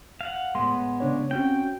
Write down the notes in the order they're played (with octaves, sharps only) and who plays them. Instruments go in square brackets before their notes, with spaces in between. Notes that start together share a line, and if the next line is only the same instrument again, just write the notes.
[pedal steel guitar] F5 F#5
[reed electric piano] A2 C6 [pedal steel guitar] G#3 B3
[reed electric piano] C#3 D4 C#5
[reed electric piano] C4 C#4 F#4 [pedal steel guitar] G5